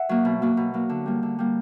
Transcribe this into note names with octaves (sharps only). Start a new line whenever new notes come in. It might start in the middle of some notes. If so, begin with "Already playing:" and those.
Already playing: E5 F#5
F#3 A#3
B2
F#3 A#3
B2
F#3 A#3
D3
G3 A#3
D3
G3 A#3